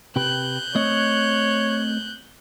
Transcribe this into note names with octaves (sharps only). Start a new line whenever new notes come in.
C3 G4 B4 F#6 G6
A3 C4 C#5 D#5